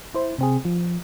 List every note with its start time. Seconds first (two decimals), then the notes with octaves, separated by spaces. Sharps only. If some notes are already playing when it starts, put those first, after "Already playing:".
0.14 E4 C5
0.38 C3 C4 G#4
0.65 F3